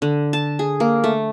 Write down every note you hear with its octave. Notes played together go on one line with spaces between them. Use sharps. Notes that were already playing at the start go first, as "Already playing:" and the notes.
D3
A5
G#4
A#3
A3